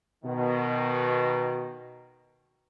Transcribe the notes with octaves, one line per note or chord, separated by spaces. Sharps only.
B2 D#3